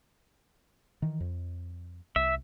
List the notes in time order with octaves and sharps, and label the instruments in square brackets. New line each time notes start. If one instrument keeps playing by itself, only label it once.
[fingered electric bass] D#3 E3
F2
[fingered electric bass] C2 [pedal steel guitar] E5